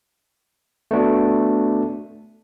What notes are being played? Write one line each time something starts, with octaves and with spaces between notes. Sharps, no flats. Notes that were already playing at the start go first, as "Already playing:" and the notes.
A3 B3 D4 F#4